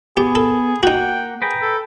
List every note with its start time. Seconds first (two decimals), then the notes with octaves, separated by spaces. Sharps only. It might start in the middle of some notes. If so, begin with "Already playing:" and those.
0.17 B3 G4 G#4
0.35 A4
0.83 A#3 D#4 F#4 F#5 G5
1.42 G#4 B4 G5 A#5
1.62 A4